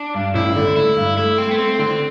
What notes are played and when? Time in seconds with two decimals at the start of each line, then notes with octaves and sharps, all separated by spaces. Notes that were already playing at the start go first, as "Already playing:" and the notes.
Already playing: D4
0.14 G2
0.34 A1 E4
0.56 D3
0.76 A3 E4
0.96 G2
1.18 A3 E4
1.38 A3 C4
1.51 B3
1.58 A3 C4
1.79 D3 C4